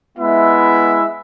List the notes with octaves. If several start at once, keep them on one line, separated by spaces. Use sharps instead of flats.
G#3 B3 E4 E5